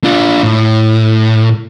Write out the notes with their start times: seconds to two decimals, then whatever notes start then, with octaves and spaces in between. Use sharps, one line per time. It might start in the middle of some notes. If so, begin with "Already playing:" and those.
0.04 D4 F4
0.43 A2